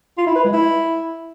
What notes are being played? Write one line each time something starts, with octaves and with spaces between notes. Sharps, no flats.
F4
E4
B4
G#3
E4